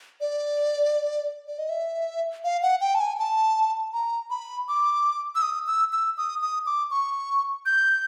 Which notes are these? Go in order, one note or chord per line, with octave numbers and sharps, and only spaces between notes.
D5
D5
D#5
E5
F5
F#5
G5
A5
G#5
A5
A#5
B5
D6
E6
D#6
E6
E6
D#6
D#6
D6
C#6
G6